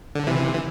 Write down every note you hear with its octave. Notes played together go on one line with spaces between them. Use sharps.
D3
C3 E3
E3